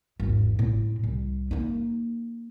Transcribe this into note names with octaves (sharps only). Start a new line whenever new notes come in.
G#1 E2
A2 C4
C2
A#3 D#4